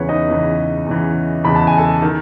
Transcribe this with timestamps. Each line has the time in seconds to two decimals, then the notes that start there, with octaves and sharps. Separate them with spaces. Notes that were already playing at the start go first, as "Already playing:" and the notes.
Already playing: E2 C#3 E3 B4 C#5
0.09 D#4 D#5
0.28 E2 C#3 E3
0.86 E2 C#3 E3
1.44 E2 C#3 E3 B5
1.55 A5
1.67 G#5
1.78 A4 A5
2.02 D#3